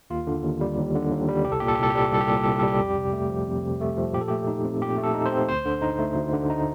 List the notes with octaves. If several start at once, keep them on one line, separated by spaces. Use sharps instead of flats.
D#2 F4
D3
D#2
G3
D#2
D3
D#2
G3
C2 G4
A4
A#2 G4
A4
G4
C2 A4
G4
G3 A4
G4
C2 A4
G4
A#2 A4
G4
C2 A4
G4
A4
G3 G4
F2
C3
A3
F3
F2
C3
A3
F3
A#2 G4
A4
A3 G4
D#4
C4
A#2 G4
A3
A4
D#4
C5
C4
D2 C5
D3
D#4
A3
D2
D3
D#4